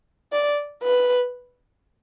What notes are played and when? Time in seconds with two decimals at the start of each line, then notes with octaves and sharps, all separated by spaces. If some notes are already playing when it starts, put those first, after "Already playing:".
0.32 D5
0.83 B4